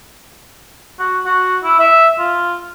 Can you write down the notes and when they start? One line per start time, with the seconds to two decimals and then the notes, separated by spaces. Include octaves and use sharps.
0.99 F#4
1.26 F#4
1.64 E4
1.79 E5
2.19 F4